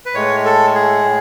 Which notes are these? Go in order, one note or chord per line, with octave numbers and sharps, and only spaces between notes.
B4
A2 G#3 C#5
A4
G#4
A2